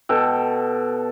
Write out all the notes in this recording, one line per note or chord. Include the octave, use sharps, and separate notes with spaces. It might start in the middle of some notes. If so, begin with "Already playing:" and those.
B2 A4 G5